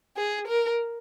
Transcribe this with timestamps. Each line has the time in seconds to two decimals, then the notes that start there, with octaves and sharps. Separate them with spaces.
0.17 G#4
0.47 A#4